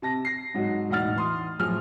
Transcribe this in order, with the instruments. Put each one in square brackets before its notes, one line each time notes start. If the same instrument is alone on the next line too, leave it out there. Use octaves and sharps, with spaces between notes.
[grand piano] C3 A5 A#6
A#6 C7
G#2 F#3 D#4 F#4
E1 A2 D#4 F#5 F6 A6
E3 C6 D#6
F#2 A2 F3 G#4 F6